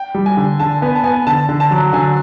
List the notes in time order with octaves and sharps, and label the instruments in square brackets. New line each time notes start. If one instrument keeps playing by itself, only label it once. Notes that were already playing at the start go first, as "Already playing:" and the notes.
Already playing: [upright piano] G5
[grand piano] G3
[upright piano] G#5
[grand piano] D3
[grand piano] D3 [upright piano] A5
[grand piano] B3 [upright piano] G#5
[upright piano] A5
[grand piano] B3 [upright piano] G#5
[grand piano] D3 [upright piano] A5
[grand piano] D3
[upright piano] A5
[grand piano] F#3
[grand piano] D3 [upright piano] G#5